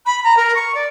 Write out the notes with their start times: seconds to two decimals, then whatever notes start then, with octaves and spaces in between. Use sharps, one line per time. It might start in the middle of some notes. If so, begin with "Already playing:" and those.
0.05 B5
0.23 A#5
0.36 A#4
0.54 C#6
0.74 D5